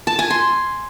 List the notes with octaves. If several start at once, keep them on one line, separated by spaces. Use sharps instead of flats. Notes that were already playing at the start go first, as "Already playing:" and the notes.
A5
G#5
C6